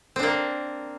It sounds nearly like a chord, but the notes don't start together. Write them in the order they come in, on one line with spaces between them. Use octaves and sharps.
C4 D4 A#3